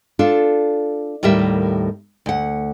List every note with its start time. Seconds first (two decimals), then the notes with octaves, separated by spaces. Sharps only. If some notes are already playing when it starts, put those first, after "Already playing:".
0.19 D4 F4 A4
1.23 D#2 A2 G3 A#4 E5
2.26 D2 F#5